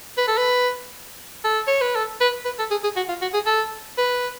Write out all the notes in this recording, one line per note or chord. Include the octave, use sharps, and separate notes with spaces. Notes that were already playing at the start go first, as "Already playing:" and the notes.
B4
A4
B4
A4
C#5
B4
A4
B4
B4
A4
G#4
G#4
F#4
F4
F#4
G#4
A4
B4